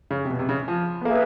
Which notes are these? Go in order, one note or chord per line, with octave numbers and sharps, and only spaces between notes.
C#3
C3
B2
C3
C#3
F3
B3
A#3 G#4 B4 E5